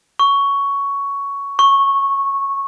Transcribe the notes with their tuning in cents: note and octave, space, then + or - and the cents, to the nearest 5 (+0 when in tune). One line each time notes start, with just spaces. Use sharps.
C#6 +10
C#6 -10